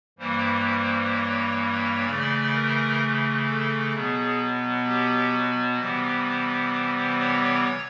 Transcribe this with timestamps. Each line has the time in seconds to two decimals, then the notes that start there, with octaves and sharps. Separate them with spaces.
0.18 G2 E3 G3 A#3 C5
0.66 C5
1.13 C#5
1.59 C#5
2.05 C#3 E3 A3 D5
2.52 A#4
3.46 A4
3.93 B2 F#3 B3 G#4
4.86 G4
5.33 F#4
5.79 C3 E3 G3 B3 C5
7.19 C#5